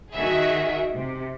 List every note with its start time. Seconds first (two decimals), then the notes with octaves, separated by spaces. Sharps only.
0.14 D#3 F#4 G#4 E5
0.93 C3